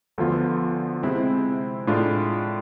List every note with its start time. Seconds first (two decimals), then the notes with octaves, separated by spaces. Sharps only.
0.18 D2 D3 F3 B3 F4
1.03 C3 G#3 C4 E4
1.87 A2 G#3 D4 F4